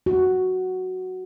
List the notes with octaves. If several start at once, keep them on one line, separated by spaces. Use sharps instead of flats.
F#4